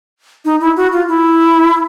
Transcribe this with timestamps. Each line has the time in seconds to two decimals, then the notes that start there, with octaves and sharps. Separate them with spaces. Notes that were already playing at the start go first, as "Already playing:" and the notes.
0.45 D#4
0.60 E4
0.77 F#4
0.92 F4
1.08 E4